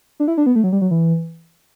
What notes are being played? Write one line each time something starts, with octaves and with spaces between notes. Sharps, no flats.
D4
E4
D4
B3
A3
F#3
G3
F#3
E3